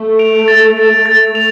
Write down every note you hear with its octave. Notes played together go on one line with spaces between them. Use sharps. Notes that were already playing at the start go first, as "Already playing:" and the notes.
Already playing: A3
D7 F7
A6
D7 F7
A3 A6
F7